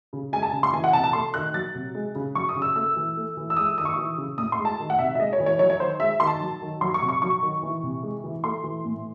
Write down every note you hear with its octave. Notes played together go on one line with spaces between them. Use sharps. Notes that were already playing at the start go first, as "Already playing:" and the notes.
C#3
G#3 G#5
A5
C#3
C6
E3 G#5
F#5
C3 A5
A5
A3 C6
D#3 F#6
F#3 A6
C3
G#3
C#3
F#3 C#6
D#6
C#3
E6
A3 E6
E3
A3
E3
E6
G#3 D#6
D#3 D#6
C#6
E3 D#6
C#3
A2 D#6
C6
G#3
A5
D#3
F#5
C3 E5
E5
G#3 D#5
C#5
E3
C#5
F#3 C#5
C#5
D#3 C5
G#3 E5
D#3 C6
A5
F#3
D#3
F#3 C6
C#6
C3
C#6
F#3 C#6
D#3
E3
C3
G#3
E3
A3 C6
E3
A2